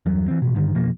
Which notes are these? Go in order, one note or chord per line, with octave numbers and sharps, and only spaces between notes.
E2 G2 F#3
E3 C4
A1 B2
G2 D3 D#3
F2 B2 F3 A#3